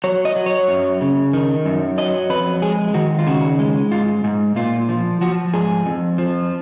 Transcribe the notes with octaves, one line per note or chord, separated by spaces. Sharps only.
F#3 C#5
D#5
F#3
C#5
F#2
C#3
D#3
F#2
F#3 D#5
F2 B4
G#3 G#4
D#3 F#4
F4
C#3 F#4
G#3
G#2 F4
G#2
A#2 F4
F3
F3 F#4
G#2 G#4
F2
F3